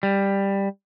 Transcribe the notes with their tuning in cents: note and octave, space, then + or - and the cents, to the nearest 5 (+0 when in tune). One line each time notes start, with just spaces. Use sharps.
G3 +10